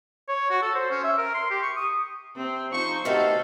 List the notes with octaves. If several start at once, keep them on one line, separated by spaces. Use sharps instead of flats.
C#5
F#4
A4
C5
C#4
E5
A#4
C6
G4
C#6
D#6
C3 C4
F3 D#4 C5 C#6
C3 D#3 A3 B3 F#4 A4 F5